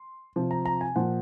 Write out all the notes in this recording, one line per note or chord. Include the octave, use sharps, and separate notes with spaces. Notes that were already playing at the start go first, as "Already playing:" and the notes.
Already playing: C6
C3 F3
A#5
A#5
G#5
A#2 F3 F#5